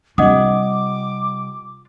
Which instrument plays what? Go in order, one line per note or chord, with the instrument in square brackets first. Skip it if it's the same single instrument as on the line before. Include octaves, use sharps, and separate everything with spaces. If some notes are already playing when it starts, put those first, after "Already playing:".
[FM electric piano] C3 G3 [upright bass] D4 F4 [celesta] D#5 F#5 D#6 [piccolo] D6